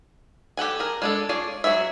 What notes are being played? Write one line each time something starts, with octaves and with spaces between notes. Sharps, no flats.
G4 A4 F#5 G#5
G#4 A#4
G#3 D4 A4
F4 G#4 C#5 D5
F#3 F#4 G#4 E5